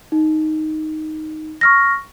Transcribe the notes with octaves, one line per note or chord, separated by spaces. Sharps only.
D#4
C#6 F6 A#6